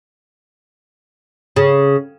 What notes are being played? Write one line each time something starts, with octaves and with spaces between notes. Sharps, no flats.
C#3